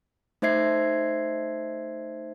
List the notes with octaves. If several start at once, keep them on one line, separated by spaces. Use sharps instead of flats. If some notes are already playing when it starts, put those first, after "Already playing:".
A3 D#4 C5 E5 G#6 C7